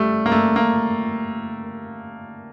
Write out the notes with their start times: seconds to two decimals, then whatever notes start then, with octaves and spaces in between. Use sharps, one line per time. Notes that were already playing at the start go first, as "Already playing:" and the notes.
Already playing: G3 A3
0.26 A#3
0.32 A3
0.56 A#3